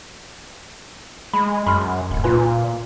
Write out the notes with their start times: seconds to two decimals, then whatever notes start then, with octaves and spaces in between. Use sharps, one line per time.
1.34 G#3 B5
1.67 F#2 B5 C6 F6
2.11 D1
2.24 A#2 F4 B4 G#5